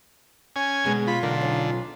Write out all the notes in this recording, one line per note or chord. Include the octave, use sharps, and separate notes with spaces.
C#4 G#5
B2 D3 G#3 B3
F4 B5
B1 D3 A#4
C#4 D#4